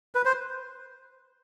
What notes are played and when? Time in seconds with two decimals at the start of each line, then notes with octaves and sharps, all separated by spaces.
0.15 B4
0.25 C5